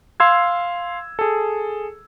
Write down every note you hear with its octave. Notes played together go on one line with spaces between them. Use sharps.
F5 C6 E6 G#6
G#4 A4